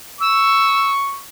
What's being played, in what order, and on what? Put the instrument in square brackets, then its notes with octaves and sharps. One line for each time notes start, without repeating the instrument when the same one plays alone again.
[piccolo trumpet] C#6 [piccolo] E6